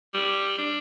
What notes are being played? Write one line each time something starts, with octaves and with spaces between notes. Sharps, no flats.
G3
D4